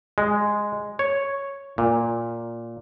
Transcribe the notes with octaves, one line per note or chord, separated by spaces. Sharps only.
G#3
C#5
A#2